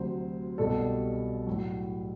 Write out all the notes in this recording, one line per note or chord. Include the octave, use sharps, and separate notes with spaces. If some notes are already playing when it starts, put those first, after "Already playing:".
Already playing: D2 C3 F#3 C5
C2 B2 G3 A4
A2 F#3